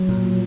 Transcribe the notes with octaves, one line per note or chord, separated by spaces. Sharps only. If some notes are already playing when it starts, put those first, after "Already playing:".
Already playing: F#3
A#2